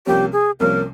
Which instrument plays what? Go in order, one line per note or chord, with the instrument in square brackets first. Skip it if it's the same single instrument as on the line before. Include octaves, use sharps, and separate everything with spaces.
[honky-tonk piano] C2 C3 F3 A#3 C#4 [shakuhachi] G4
[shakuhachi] G#4
[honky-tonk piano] C2 C3 F3 A#3 C#4 [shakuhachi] A#4